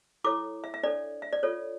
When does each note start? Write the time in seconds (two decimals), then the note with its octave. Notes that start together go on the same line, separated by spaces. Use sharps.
0.24 E4 A4 C#5 D6
0.64 E5
0.74 E5
0.83 D4 A4 C#5 D5
1.22 E5
1.33 D5
1.43 F4 A4 C#5